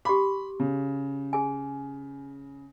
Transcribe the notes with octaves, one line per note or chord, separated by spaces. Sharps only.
G4 B5 C6 D6
C#3
G#4 G#5